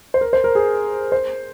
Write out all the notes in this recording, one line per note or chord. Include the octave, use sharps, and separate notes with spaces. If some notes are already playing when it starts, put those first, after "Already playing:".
C5
A#4
C5
A#4
G#4
C5